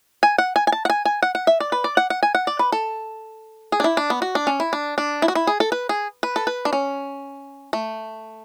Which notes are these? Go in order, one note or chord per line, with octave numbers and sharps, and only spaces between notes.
G#5
F#5
G#5
G#5
A5
F#5
G#5
G#5
F#5
F#5
E5
D5
B4
D5
F#5
F#5
G#5
F#5
D5
B4
A4
G#4
D4
E4
D4
B3
F#4
D4
C#4
E4
D4
D4
E4
F#4
E4
G#4
A4
B4
G#4
B4
A4
B4
D4
C#4
A3